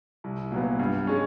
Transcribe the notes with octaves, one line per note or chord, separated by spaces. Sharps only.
C2
A#2 F#3 B3
G2
G#3 C#4